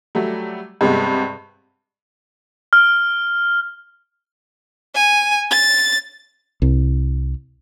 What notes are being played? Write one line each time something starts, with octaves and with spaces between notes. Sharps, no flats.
F#3 G3 A3
G2 C3 G3 G#3 B3
F6
G#5
A6
C2